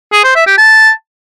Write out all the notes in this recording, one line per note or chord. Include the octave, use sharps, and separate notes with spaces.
G#4
C5
E5
G4
A5